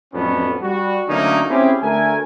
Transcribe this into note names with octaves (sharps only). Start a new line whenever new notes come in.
F2 A2 F#3 B3 C#4 D4
G3 F#4
D3 F#3 A3 A#3 C#4 D#4
C4 C#4 E4 G4 G#4
D2 A3 A#4 G#5